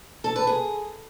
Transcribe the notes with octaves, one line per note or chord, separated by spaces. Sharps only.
A4
B4
G#4